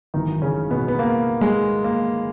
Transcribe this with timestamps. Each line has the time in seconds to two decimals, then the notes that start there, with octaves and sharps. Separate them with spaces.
0.14 G#1 F#2 D#3 E3 D#4
0.42 C#3 C#4
0.71 B2 B3
0.88 B3
0.99 A#3
1.41 G#3
1.84 A#3